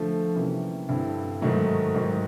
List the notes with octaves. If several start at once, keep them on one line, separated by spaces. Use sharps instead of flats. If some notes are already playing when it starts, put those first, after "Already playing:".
Already playing: D3 F3 A3
C3 E3 G3 A#3 C#4
G2 D3 G3 C4 E4
G#2 D#3 F#3 A3
G#2 D#3 F#3